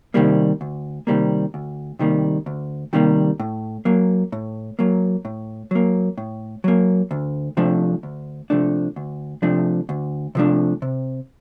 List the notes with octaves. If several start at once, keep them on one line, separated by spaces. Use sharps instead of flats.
C3 D#3 G3 A#3
D2
C3 D#3 G3 A#3
D2
C3 D#3 G3 A#3
D2
C3 D#3 G3 A#3
A2
F#3 A#3
A2
F#3 A#3
A2
F#3 A#3
A2
F#3 A#3
D2
C3 F3 A3 D4
D2
C3 F3 A3 D4
D2
C3 F3 A3 D4
D2
C3 F3 A3 D4
C3